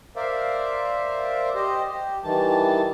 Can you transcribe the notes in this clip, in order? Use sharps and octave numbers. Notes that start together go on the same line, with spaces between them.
A#4 C5 D5 E5 F5
G4 C5 D#5
G4
D#3 E3 G3 A5